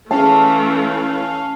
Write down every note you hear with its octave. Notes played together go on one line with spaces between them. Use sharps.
E3 A3 C#4 F5 A5